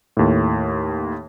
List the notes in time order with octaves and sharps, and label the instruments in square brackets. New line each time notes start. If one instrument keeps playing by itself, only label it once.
[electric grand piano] D#2 A2